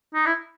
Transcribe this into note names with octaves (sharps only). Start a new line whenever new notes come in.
D#4
E4